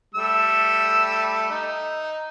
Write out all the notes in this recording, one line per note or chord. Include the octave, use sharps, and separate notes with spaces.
G3 A3 E6
D#4